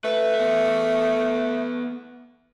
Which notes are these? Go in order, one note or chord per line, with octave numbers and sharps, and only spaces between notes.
A3 B4
B3 E5